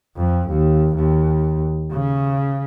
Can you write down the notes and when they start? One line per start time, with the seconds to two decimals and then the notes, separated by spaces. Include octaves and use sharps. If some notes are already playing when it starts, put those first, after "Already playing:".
0.17 F2
0.49 D#2
0.95 D#2
1.91 C#3